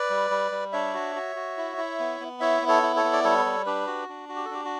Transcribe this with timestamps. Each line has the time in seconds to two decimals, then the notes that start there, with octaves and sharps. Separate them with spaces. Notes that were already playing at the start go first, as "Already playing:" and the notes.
Already playing: B4 D5
0.10 G3
0.31 G3
0.52 G3
0.72 D4 C#5 E5
0.94 F#4
1.15 F#4
1.36 F#4
1.57 E4
1.77 E4
1.99 B3
2.20 B3
2.40 E4 C#5 E5
2.62 B3
2.68 A4 C#5
2.82 E4
2.96 A4 C#5
3.04 B3
3.13 D5
3.24 G3 A4 C#5
3.45 G3
3.66 D4 G4 B4
3.87 F#4
4.09 D4
4.29 F#4
4.36 G4
4.45 A4
4.50 D4 G4
4.65 F#4